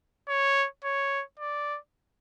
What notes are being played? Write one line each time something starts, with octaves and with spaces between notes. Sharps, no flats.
C#5
C#5
D5